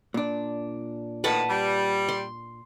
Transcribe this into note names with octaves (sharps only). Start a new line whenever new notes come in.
A#2 D4
A2 D#3 B4 F#5 A5
G3
C6